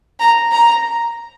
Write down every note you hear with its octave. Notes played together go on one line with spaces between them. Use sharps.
A#5
A#5